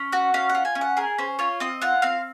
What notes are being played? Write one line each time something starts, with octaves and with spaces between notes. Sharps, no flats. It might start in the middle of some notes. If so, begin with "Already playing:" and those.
Already playing: C#4
F#4 F#5
C#4 F5
F#5
F4
G#5
C#4
F#5
G#4 A#4
C#4 C5
F4 C#5
C4 D#5
F4 F#5
C4 F5